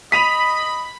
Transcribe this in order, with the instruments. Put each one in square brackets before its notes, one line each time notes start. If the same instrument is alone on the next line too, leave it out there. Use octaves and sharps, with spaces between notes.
[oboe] D#5 [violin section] B5 [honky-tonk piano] B6 D#7 F7